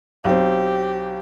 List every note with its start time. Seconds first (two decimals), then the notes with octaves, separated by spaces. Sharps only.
0.25 B1 C4 G4